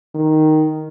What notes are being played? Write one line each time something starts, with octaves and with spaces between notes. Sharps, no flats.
D#3